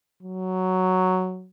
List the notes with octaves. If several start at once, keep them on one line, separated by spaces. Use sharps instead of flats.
F#3